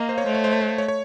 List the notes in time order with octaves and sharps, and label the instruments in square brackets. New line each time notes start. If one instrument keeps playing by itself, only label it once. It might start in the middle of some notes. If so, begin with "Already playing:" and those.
Already playing: [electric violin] A#3 [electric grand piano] D#5 F5
[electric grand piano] C5
C#5
[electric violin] A3 [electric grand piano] C5
[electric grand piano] C#5
C5
C#5
C5
C#5
C#5